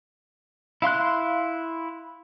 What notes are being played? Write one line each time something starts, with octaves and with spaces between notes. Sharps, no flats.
E4 F5 C6 F#6